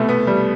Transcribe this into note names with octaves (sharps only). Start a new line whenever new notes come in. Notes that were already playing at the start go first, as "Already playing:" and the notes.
Already playing: C2 B2 A3
B3
G3